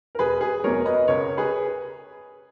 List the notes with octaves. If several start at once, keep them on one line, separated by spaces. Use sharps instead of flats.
A#4
E1 G#4 B4
G#4 B4
E2 B2 F#3 A#4 C#5
B4 D#5
C#2 A#4 C#5
G#4 B4